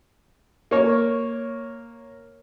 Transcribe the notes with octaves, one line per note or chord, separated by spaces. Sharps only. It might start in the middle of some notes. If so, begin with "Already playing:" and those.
A#3 C#5